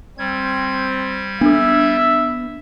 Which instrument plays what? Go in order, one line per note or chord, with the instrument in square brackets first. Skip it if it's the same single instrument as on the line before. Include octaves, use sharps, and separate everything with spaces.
[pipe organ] G3 G#6 [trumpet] C4
[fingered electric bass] B3 [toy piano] D4 A4 [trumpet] E5